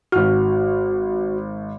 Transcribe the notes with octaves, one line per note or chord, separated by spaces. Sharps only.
G#1 F#4 F6